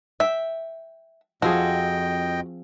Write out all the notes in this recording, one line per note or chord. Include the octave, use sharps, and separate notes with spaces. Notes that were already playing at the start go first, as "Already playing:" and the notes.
E5 G5
F2 F3 C4 F#4 G#4 D#5 G5